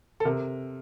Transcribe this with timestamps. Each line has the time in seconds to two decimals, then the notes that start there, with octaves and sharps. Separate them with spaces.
0.20 A4
0.25 C3 A#4